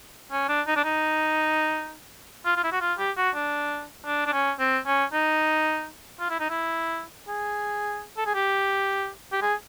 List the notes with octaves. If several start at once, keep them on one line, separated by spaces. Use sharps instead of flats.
C#4
D4
D#4
D4
D#4
F4
F4
E4
F#4
F4
G4
F#4
D4
D4
D4
C#4
C4
C#4
D#4
F4
E4
D#4
E4
G#4
A4
G#4
G4
G4
G#4